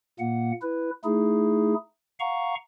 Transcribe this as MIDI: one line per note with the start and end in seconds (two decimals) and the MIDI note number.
0.19 0.52 46
0.19 0.52 58
0.19 0.52 78
0.62 0.90 64
0.62 0.90 71
1.04 1.74 57
1.04 1.74 63
1.04 1.74 64
1.04 1.74 68
2.20 2.55 77
2.20 2.55 78
2.20 2.55 82
2.20 2.55 85